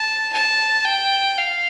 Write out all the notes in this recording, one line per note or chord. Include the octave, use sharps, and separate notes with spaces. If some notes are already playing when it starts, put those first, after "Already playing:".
Already playing: A5
A5
G5
F5